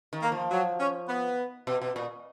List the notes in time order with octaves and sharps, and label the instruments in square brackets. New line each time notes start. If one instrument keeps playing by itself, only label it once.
[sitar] D#3
[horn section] A#3
[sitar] F3
[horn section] F#3
C#4
B3
[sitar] B2
B2
A#2